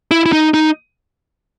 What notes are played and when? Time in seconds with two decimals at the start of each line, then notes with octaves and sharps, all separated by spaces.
0.11 E4
0.26 E4
0.33 D#4
0.54 D#4